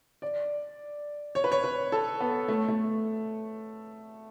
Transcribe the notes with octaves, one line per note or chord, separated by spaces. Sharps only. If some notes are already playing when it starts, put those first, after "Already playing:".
D5
C#5
B4
C#5
B4
A4
B3
A3
A3